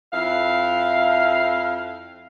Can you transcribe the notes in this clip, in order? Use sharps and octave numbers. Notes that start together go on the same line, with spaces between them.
F2 E4 F5